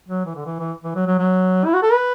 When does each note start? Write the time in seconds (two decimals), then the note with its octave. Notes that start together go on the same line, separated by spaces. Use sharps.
0.08 F#3
0.26 E3
0.36 D3
0.46 E3
0.60 E3
0.84 E3
0.95 F#3
1.07 F#3
1.19 F#3
1.66 E4
1.74 F#4
1.83 A4
1.91 B4